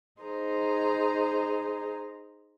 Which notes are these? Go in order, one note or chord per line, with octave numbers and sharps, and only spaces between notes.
D#4 G#4 C5 A#5